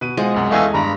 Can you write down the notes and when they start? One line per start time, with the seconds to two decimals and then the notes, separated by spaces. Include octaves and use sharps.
0.01 B2 B4 D#7
0.17 G#3 F4 C5 F#5
0.34 C2 F#2 F#5
0.51 E2 E3 A3 G#4 D#5 F5 G#5 E6
0.63 D#6
0.74 G2 A#5 B5